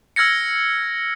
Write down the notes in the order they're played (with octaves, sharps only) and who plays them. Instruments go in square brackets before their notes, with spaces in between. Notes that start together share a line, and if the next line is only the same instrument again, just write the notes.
[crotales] E6 F6 G#6 A#6 C#7